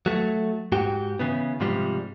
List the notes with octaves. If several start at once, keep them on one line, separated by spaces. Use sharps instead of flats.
F#3 A3
G#2 F#4 G4
C#3 E3 B3
G#2 C3 F3 G3 G#3